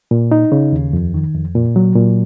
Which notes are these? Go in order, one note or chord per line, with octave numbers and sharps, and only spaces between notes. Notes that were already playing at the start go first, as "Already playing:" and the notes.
A#2
D#4
C#3
D#2
F2
D#3
F2
A#2
F#3
A#2